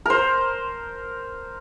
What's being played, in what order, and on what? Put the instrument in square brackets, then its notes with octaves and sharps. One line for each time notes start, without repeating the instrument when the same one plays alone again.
[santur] A#4 C5